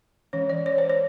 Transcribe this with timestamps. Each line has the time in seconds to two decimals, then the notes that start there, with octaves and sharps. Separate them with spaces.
0.33 E3 G#3 C#4 C#5
0.50 D5
0.66 C#5
0.78 C5
0.90 C#5